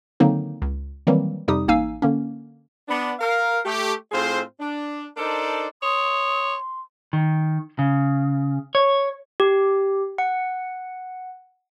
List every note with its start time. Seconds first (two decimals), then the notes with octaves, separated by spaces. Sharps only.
0.20 D3 D#3 F#3 A#3 C4 D#4
0.62 C#2
1.07 D#3 E3 F#3 G3 A#3 C4
1.48 F2 C3 G3 D#4 G4 D#6
1.68 A1 A#3 D#4 F5 G#5 E6
2.02 D3 A#3 C#4
2.89 B3 D4
3.20 A#4 F5
3.65 A3 G4
4.12 A2 C4 F4 G#4 C5
4.60 D4
5.17 D4 D#4 A4 A#4 C5 D5
5.83 C#5 C6 D#6
7.13 D#3
7.79 C#3
8.75 C#5
9.40 G4
10.18 F#5